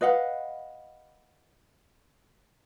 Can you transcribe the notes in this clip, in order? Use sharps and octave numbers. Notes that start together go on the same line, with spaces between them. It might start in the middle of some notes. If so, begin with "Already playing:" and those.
B4 D#5 F5 F#5